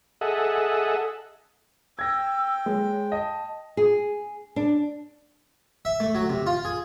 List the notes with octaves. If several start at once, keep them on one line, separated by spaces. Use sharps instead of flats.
G#4 A4 D#5 E5 F#5
G5 E6 G#6 A#6
G#3 C#5
D#5 A5
G#4
D4
E5
A3
F#3
C3
F4
G#4